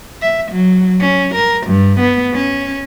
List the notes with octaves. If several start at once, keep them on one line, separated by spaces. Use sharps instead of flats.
E5
F#3
C#4
A#4
G2
B3
C#4